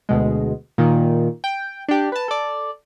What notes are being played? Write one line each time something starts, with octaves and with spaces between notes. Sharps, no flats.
D2 B2 G#3
A#2 D#3
G5
D4 G4
B4 A5
A4 D5